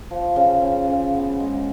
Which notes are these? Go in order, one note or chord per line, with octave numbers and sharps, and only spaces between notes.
F3
C#3
C#3
C#3
B3
G#3